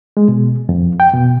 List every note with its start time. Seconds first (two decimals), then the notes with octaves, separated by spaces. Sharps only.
0.17 G#3
0.28 B2
0.69 F2
1.00 G5
1.13 B2